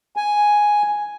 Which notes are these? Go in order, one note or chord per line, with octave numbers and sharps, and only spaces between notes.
G#5